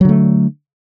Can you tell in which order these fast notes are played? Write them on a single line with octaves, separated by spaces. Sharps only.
F#3 D3 A3